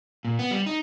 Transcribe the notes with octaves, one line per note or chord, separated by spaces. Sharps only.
A#2
B3
G3
D#4